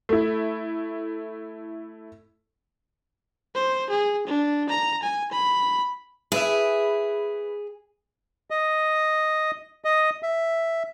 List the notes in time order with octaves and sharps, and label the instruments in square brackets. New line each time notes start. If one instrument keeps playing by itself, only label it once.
[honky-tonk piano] A3 E4
[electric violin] C5
G#4
D4
A#5
G#5
B5
[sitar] E4 B4 E5 [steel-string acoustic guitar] G#4
[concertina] D#5
D#5
E5